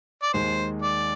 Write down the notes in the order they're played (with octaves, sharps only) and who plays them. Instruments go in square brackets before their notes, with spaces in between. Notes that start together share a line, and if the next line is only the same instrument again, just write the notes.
[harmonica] D5
[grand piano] D#2 D#3 G#3 [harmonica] C5
[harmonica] D5